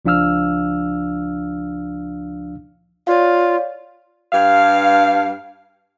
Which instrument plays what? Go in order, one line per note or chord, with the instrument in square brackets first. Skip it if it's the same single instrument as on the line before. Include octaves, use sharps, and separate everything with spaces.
[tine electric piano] C#2 F3 D4 F5 E6 F6
[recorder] F4 [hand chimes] C#5 D5 F5
[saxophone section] G2 F5